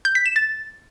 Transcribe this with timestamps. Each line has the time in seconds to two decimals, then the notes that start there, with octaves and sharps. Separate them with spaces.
0.05 G6
0.15 B6
0.26 E7
0.36 A6